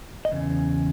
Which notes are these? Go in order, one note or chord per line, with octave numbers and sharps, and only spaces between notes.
D#5
E2 C#3